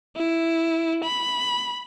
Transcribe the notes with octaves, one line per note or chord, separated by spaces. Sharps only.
E4
B5